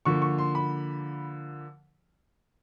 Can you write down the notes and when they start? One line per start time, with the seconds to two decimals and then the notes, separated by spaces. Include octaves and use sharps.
0.05 D3 F3 A#3 C#6
0.22 C#6
0.38 C6
0.55 B5